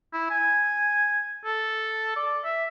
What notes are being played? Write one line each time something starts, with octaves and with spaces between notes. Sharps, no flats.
E4
G#5
A4
D5
E5